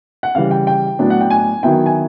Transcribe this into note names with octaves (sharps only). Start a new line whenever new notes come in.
F#5
C#3 E3 G3 F5
G5
G5
A2 F#3 B3 D4
F#5
G5
G#5
D#3 F#3 B3 E4 G5
G#5